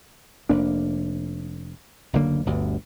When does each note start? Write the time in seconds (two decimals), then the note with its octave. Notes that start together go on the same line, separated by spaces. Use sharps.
0.49 F1 A#3 D4
2.13 F#1 D2 D3 A#3
2.46 G1 D2 G2